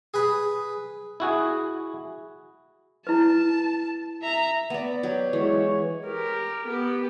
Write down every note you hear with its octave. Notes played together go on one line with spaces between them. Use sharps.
G#4 B4 B5
E4 F#4 G#4
E4 B4 A5
E5 A#5
B3 D5
F#3 G4
E3 G#3 C#5
G4 A#4
B3 G4